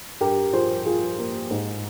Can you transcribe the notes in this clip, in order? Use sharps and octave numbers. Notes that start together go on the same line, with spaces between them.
G2 G4 A#4
F3 G#4 C5
F3 F4 G#4
A#3
G#2